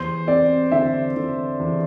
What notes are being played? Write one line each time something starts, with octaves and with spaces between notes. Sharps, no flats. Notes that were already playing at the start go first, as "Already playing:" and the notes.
Already playing: E2 C5
C4 D5
D3 E5
D3
E2